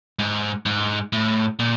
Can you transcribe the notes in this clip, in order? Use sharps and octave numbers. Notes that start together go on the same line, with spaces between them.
G#2
G#2
A2
A#2